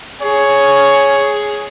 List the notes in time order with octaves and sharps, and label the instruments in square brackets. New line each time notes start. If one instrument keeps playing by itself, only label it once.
[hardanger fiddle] G#4 [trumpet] C#5